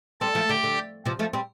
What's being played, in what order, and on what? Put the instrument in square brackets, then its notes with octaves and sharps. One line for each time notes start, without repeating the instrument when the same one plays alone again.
[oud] G3 C4 [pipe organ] A4 A5
[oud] F3 A3
[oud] D3 [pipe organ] G4 G5
[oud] D3
C3 F3
F3 A3
G3 C4